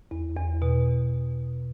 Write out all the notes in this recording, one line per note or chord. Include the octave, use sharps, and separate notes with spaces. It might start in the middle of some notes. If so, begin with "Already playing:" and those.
E2
E2
B2